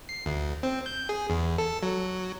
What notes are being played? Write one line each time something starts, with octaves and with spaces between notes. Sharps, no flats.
C7
D2
C4
G6
G#4
E2
A4
F#3